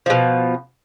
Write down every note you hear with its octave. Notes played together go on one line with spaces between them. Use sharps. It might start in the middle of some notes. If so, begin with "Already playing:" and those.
B2 F3